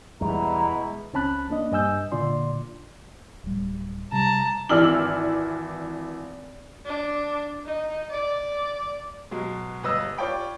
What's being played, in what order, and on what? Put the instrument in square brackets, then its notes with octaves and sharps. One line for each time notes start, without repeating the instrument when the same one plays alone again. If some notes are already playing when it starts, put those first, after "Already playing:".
[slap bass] E2 G3 [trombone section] B2 E4 [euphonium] G#3 [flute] A#5
[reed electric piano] C#2 C4 C#4 A5 B5 F#6
A#3 D4 D#5
G2 D#5 G#5 E6 G6
A#2 D3 F4 D5 C6
[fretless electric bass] D1 G3
[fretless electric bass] C3 G3 [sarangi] A5 [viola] A#5
[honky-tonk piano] G#1 E3 D5 E6 F6 F#7
[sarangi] D4
D#4
D5
[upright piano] B2 F#3 G#3
G1 B4 D#5 E6
F4 C#5 D5 G5 B5